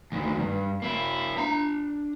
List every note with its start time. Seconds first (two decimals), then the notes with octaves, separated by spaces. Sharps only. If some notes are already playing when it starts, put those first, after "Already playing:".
0.12 D2 D#3
0.40 G2
0.82 A#3 E4
1.38 D4 A#5